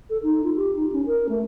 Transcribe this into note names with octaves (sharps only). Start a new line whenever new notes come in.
A4
D#4
F4
G4
D#4
C#4
A#4
A3